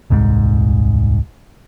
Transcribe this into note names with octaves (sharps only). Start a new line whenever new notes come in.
D#1 C2 G#2